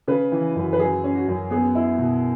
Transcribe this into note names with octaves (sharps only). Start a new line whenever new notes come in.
C#3 B4
E3
F#2
B4
F#3 G#4
C#4
F#4
F#2
B3 G#4
E4
B2